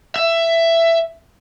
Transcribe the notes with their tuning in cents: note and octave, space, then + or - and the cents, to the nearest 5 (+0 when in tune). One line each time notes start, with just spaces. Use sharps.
E5 +15